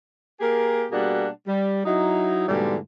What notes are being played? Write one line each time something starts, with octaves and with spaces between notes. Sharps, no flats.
A#3 G4 G#4 A#4
B2 G3 A#3 D4 G#4 F#5
G3
F#3 D#4 E4
G#2 B2 D3 E3 G3 A3